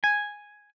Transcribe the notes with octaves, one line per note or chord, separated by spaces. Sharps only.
G#5